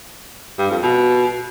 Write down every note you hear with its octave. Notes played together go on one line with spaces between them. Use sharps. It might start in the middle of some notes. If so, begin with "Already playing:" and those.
G2
F2
B2